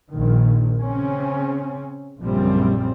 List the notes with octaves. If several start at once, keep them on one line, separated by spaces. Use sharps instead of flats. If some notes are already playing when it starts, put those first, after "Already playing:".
A#1 A#2 D#3
C#3 C4 C#4
A#1 F#2 C#3 F3 G3 C4